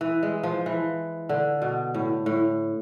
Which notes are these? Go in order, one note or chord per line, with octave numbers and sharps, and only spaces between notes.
E3
G#3
F3
E3
D3
B2
A2
A2